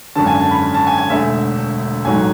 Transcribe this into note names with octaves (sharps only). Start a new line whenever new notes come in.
G#1 F#2 D3 A5
G#5
A5
B5
A5
G#5
G#5
E1 D2 D3 A3 E5
A1 G#2 F#3 A3 G#5